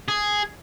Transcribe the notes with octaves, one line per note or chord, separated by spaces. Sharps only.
G#4